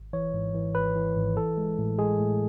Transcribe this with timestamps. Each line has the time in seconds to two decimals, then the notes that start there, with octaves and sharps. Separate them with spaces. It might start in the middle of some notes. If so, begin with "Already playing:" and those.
Already playing: G#1
0.13 E3 C#5
0.33 G#2
0.54 E3
0.75 G#1 B4
0.95 E3
1.16 G#1
1.37 E3 A4
1.57 G#3
1.78 A2
1.99 G#3 G#4
2.19 A2